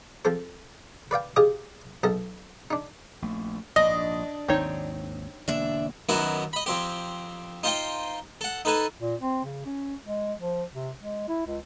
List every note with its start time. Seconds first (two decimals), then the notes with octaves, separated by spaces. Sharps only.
0.25 F3 C4 A4 C5
1.11 B4 D5 F5 G5
1.36 F4 G4 G#4 C5 D#5
2.03 B1 A4 D#5 A5
2.71 D4 D#4
3.22 A#1 A3
3.76 A#1 G#2 D4 D#5
4.48 G#1 D#2 C4 D#4 C#5
5.48 E1 D3 A#3 D4 E5
6.09 F#2 D#3 B3 E4 F#4
6.53 D#5 B5
6.66 F2 C4 G4
7.63 D#4 F4 C5 D#5 G5
8.41 A4 F#5
8.65 D#4 A4 B4 G#5 A5
9.01 A#2
9.21 C4
9.44 C#3
9.66 C#4
10.04 G#3
10.39 F3
10.73 C3
11.00 G#3
11.28 E4
11.47 C#2